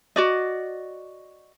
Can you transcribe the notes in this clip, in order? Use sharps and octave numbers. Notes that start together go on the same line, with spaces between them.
F#4 D5 D#5